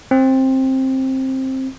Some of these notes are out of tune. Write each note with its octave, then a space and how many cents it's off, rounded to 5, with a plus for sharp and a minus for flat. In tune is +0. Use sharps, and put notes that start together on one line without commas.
C4 +15